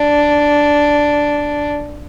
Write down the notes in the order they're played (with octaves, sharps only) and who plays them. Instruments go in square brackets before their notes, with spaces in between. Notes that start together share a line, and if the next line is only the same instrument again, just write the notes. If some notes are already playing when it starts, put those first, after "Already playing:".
Already playing: [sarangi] D4